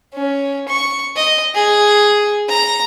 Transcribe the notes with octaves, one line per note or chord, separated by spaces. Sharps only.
C#4
C#6
D#5
G#4
A#5